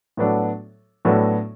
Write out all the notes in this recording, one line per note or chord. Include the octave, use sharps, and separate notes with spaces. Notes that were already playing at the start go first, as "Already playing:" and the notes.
A2 F#3 B3 D4 A4
A2 F#3 B3 D4 A4